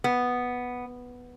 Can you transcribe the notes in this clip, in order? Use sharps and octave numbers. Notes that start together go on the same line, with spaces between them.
B3